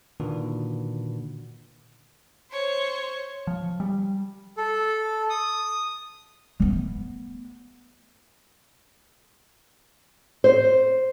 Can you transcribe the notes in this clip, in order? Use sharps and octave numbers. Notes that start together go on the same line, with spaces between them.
A#2 D3 D#3 D4 F#4 B4
C5 C#5
F3
G3
A4
D#6
A3 B3
C5